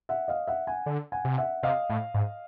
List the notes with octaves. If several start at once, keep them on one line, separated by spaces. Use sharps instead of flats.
E5 F#5
D#5 F5
E5 F#5
F#5 G#5
D3
F#5 G#5
C3
E5 F#5
C3 D#5 F5
A2
G#2